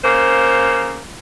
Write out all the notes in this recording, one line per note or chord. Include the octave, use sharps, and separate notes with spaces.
C#3 A#3 C5